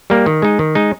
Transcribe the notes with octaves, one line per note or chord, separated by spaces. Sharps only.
G3 A#3
D#3
G#3 D#4
D#3
G#3 D#4